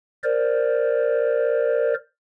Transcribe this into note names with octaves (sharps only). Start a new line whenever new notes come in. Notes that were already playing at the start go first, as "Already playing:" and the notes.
A#4 C5 D5